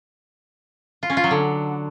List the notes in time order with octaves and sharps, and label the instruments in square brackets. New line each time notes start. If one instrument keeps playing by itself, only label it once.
[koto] F4
C#4
F4
F#3
D3